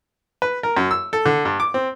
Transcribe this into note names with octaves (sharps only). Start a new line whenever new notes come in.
B4
A#4
F#2
E6
A4
D3
G2
D6
C4